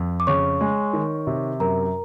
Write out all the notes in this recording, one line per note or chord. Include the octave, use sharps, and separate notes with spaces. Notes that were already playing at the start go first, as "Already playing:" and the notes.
Already playing: F2
D6
C#3 C#5 C#6
G#3
D#3
C3
F#2 A#4 A#5